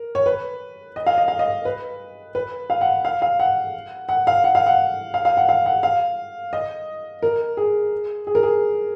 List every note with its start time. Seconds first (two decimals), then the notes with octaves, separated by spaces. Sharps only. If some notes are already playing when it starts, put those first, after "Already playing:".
Already playing: A#4
0.15 C#5
0.26 B4
0.96 D#5
1.06 F5
1.18 D#5
1.28 F5
1.39 D#5
1.65 B4
2.35 B4
2.70 F5
2.81 F#5
3.05 F5
3.22 F5
3.39 F#5
4.09 F#5
4.27 F5
4.44 F#5
4.55 F5
4.66 F#5
5.14 F5
5.25 F5
5.37 F#5
5.49 F5
5.66 F#5
5.83 F5
6.53 D#5
7.23 A#4
7.57 G#4
8.27 G#4
8.35 A#4
8.43 G#4